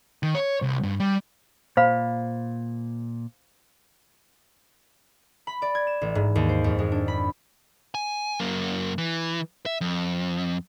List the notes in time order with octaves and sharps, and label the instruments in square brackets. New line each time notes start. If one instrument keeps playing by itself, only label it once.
[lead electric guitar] D#3
C#5
C2
G2
G3
[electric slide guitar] A#2 [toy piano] C5 F5 B5
[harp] B5
D5
G#6
E7
A1
G#2
D#2
C5
F2
G#3
D4
B5
[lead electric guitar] G#5
F#2 A#3
E3
E5
F2